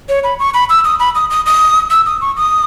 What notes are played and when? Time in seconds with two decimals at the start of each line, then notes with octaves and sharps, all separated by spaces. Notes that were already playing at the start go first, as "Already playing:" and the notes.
0.09 C#5
0.24 B5
0.40 C#6
0.54 B5
0.70 E6
0.85 D#6
0.99 B5
1.15 D#6
1.30 D#6
1.46 D#6
1.91 E6
2.06 D#6
2.21 C#6
2.37 D#6